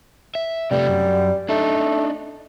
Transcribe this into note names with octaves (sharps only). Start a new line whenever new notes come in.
E5
C3 G3 A3
F#2
A3 D4 D#4